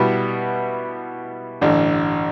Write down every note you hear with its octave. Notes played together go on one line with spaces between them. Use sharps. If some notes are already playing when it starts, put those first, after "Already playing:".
Already playing: B2 G3 B3 E4
A1 G2 D3